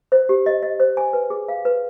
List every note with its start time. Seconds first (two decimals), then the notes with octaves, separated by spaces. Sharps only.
0.12 C5
0.29 G4
0.46 D#5
0.63 D#5
0.80 C5
0.97 G#5
1.13 B4
1.30 G#4
1.48 F5
1.65 B4